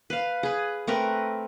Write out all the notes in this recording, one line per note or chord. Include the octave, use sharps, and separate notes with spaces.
B4 F5
G#4 B4
A3 C4 A#4 B4